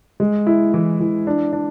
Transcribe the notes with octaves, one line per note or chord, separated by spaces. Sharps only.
G#3
E4
E3
E3
D4
D4